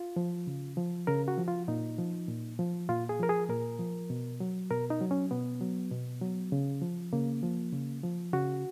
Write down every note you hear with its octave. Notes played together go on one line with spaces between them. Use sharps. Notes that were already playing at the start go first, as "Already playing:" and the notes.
Already playing: F4
F3
C#3
F3
C#3 A#4
F#4
F3
F4
A#2 D#4
F3
A#2
F3
A#2 F4
G#4
F3 A#4
G#4
A#2 A#4
F3
B2
F#3
B2 A#4
D#4
F#3
C#4
B2 B3
F#3
B2
F#3
C#3
F3
C#3 A#3
F3
C#3
F3
C#3 F#4